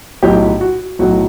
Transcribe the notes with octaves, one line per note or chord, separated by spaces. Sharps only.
B1 A2 F#3 G4
F#4
B1 A2 F#3 F#4